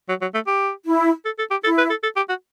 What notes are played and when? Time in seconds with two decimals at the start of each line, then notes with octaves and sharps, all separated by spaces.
0.09 F#3
0.21 F#3
0.34 A3
0.47 G4
0.86 E4
1.25 A4
1.39 A4
1.51 G4
1.64 E4 A4
1.78 B4
1.90 A4
2.03 A4
2.16 G4
2.29 F#4